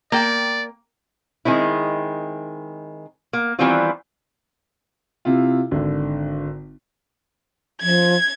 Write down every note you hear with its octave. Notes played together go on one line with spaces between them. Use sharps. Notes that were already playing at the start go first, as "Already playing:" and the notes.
A#3 D5 G5
D#3 G#3 C4 E4
A#3
D#3 E3 G3 B3 C4 F4
C3 E4 F4
G#1 D3
F3 G#6